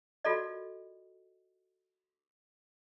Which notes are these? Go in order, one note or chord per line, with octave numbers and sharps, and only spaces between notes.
F4 F#4 A4 A#4 D5 D#5